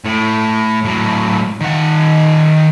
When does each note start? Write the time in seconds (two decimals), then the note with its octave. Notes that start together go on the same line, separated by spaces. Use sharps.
0.05 A2
0.85 A2 F#3
1.60 D#3 F#5